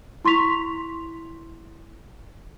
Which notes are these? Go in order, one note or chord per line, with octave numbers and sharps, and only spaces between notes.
E4 C6 C#6 B6 F7